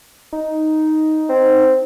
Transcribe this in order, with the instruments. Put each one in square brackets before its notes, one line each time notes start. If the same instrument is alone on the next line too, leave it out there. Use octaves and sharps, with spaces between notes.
[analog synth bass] D#4
[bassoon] C4